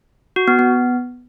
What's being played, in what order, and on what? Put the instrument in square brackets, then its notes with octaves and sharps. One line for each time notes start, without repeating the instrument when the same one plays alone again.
[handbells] F#4
B3
B3